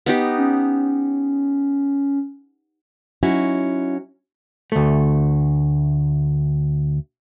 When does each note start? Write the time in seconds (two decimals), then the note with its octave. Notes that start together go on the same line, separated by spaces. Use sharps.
0.06 B3 D#4 G4
0.38 C#4
3.23 F#3 C#4 D#4 E4 F#4
4.72 D2 A3